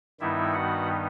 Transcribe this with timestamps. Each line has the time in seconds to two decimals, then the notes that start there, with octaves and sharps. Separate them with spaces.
0.20 G2 D#3 G3 B3 D#4 E4 E5
0.54 F#4 F#5